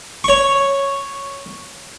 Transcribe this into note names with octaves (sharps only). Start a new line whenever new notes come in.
C#5 C#6